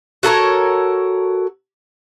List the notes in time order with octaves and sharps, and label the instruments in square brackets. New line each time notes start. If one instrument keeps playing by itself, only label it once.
[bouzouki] F#4 A4 A#4 C#5